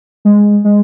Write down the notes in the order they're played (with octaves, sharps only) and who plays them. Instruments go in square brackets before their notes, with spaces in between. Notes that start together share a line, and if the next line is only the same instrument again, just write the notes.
[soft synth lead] G#3
G#3